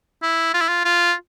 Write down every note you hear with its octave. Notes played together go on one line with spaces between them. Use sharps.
E4
F4
E4
F4
F4